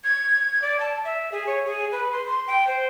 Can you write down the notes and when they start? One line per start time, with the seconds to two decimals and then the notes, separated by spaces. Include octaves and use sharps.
0.04 G#6
0.62 D5
0.80 A5
1.05 E5
1.32 G#4
1.47 C#5
1.66 G#4
1.92 B4
2.12 C6
2.25 C6
2.47 G5
2.67 C5